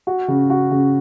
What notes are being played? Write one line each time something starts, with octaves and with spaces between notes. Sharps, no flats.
F#4
C#3
F#4
C#3